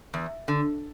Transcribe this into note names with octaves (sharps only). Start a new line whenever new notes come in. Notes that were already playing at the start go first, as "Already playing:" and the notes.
E2
D3